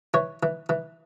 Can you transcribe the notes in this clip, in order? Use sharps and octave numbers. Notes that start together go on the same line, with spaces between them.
E3 C#5
E3
E3